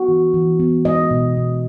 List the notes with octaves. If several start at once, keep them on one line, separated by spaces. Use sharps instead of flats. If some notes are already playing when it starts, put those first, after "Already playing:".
Already playing: B3 F#4
E3
E3
B3
G#3 D#5
B2
B2